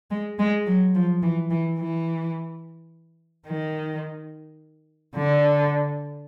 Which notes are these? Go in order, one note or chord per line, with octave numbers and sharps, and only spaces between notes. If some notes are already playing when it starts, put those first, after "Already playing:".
G#3
G#3
F#3
F3
E3
E3
E3
D#3
D3